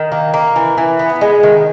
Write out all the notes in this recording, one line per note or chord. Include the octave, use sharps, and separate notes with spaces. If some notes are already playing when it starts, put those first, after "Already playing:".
Already playing: D#3
A#3
A#3
E3
E3
B3
G#3
D#3